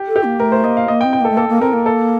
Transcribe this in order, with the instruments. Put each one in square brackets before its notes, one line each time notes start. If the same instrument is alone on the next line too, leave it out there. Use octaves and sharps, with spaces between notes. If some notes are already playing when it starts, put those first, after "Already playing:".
Already playing: [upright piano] G4
[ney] A4
[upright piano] G4
[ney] A#3
[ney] A3 [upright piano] A#4
[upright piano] C5
[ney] A#3 [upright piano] D#5
[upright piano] F5
[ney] A#3 [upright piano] D#5
[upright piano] G5
[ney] C4
[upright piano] G5
[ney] A#3 [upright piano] A4
[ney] A3
[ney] A#3 [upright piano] A4
[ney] A#3
[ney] C4 [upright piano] A#4
[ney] A#3
[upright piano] A4